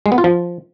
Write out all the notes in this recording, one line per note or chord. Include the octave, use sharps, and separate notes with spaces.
G#3
B3
F4
F3